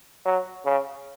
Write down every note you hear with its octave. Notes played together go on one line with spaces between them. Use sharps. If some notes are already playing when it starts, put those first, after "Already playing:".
F#3
C#3